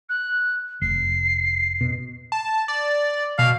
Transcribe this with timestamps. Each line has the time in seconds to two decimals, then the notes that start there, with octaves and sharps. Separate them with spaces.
0.09 F#6
0.82 F1 C7
1.81 B2
2.32 A5
2.68 D5
3.38 B2 F5